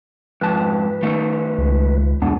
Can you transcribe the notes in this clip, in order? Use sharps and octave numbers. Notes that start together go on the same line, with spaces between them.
F2 G#2 B4 A5
D#3 A3 D#4
C#2
E2 G#2 B2 B3 D4